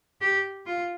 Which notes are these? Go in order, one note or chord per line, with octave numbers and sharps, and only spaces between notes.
G4
F4